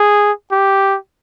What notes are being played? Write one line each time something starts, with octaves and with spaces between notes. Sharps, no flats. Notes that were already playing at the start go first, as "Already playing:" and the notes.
Already playing: G#4
G4